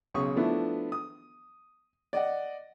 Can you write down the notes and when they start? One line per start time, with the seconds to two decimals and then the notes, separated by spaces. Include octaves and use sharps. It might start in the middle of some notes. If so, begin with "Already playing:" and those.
0.14 B1 C#3 C#6 D#6
0.36 F3 A3 B3 D4 E4
0.92 D#6
2.13 D5 D#5 F#5